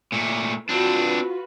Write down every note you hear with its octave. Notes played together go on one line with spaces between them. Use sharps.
A#2 A3
C4 D4 F4 F#4 B4